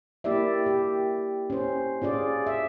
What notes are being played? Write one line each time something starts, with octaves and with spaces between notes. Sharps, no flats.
A#3 E4 G4 D5 E5
G4
C#4 C5
C#4 F4 G#4 D5
E5